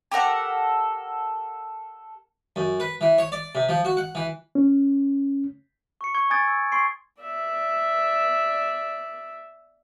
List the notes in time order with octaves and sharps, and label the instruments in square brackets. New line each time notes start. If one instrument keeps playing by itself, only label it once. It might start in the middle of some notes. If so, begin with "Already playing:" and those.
[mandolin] G4 A4 A#4 F#5
[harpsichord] F#2
B4
E3
C#5
D5
C3
F3
F#4
F#5
E3
[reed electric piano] C#4
[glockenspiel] C#6 C#7
C#6 G#6 C#7
G#5 D#6 G#6 A6 D7
E6
C6 C#6 C7 D7
[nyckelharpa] D5 E5